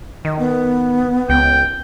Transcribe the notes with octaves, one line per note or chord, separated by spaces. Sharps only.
D#3 D#5
B3
C#2 G5